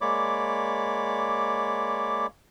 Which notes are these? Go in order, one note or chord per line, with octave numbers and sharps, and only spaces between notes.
G#3 A#3 C#5 D5 B5 D6